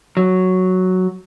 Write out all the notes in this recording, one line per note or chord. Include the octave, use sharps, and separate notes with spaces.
F#3